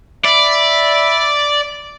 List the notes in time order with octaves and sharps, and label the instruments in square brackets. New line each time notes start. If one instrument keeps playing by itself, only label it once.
[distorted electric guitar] D5 [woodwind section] E5 B5